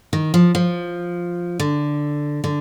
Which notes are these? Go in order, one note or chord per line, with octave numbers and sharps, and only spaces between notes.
D#3
F3
F3
D3
D3